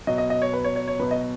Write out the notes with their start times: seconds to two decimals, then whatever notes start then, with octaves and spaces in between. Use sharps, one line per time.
0.07 B2 F#3 D#5
0.18 D#5
0.30 D#5
0.42 C#5
0.53 B4
0.64 C#5
0.76 C#5
0.87 C#5
0.99 B2 F#3 B4
1.11 D#5